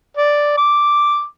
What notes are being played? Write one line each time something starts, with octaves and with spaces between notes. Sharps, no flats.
D5
D6